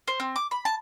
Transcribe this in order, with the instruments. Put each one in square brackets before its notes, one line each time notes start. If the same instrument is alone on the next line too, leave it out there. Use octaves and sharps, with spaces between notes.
[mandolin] C5
C4
D6
B5
A5